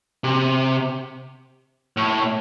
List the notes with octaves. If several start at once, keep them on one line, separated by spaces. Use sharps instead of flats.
C3
A2